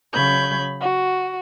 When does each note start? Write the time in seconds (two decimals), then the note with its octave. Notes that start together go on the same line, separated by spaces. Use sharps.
0.13 C#3 F#3 B5 G6 G#6
0.80 F#4